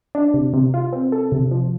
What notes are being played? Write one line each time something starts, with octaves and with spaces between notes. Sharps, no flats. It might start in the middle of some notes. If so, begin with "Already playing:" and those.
D4
C3
C3
F4
C4
A4
C3
F3